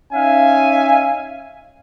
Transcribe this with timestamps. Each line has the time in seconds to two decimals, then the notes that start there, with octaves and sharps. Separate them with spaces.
0.14 C#4 D#4 E5 F5 G#5